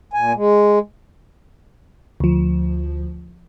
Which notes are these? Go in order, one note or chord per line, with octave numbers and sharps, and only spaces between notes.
A#2 G#5
G#3
D2 F3